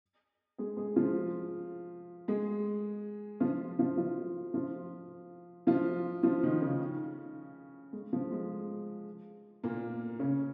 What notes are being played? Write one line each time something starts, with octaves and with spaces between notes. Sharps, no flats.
G#3 G#4
G#3 G#4
F3 F4
G#3 G#4
F3 F4
F3 F4
F3 F4
F3 F4
F3 F4
F3 F4
D#3 D#4
C#3 C#4
G#3
F3
G#3
A#2 A#3
C#3 C#4